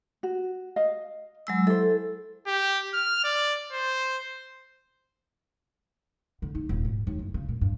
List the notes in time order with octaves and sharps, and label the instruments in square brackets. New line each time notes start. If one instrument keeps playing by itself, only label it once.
[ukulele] F#4
D#5 F5
[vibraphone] F#3 G#3 E6
[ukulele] E4 C5 [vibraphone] A4
[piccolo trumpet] G4
F6
D5
C5
[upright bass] D3
D#4
D#1
G#2
D#2
F#1
C#3
A#2
G2